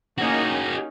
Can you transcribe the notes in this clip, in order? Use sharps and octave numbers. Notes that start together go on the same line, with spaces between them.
A#3 C#4 D#4 F#4 G#4